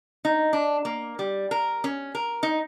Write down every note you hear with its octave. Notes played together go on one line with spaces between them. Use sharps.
D#4
D4
A#3
G3
A#4
C#4
A#4
D#4